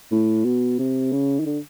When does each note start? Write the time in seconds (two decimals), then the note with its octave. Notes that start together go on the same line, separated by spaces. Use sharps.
0.11 A2
0.45 B2
0.79 C3
1.12 C#3
1.40 D#3
1.46 D3